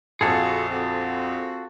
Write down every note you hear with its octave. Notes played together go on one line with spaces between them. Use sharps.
A#1 F2 F4 F#4 G#4 A4
C4 F4 F#4